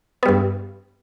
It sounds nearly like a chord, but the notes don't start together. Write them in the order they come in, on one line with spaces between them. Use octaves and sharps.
B3 G3 G2